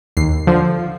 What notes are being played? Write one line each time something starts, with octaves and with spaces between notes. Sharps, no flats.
D#2 C7
D3 F3